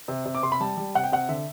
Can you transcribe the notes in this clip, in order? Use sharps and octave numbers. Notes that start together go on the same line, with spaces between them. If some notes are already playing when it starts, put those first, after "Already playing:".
C3
C3
D6
C3 C6
B5
G3 A5
G3
C3 F#5
G5
C3 F#5
D3 E5